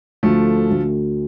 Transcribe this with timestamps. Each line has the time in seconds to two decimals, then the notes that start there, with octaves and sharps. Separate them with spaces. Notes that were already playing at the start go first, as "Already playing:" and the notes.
0.23 D2 F3 A3
0.70 D2